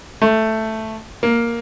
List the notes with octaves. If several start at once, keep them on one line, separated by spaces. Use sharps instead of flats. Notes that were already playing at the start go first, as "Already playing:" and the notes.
A3
A#3